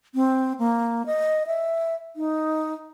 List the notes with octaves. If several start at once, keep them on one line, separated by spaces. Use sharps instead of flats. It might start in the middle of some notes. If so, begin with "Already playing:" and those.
C4
A#3
D#5
E5
D#4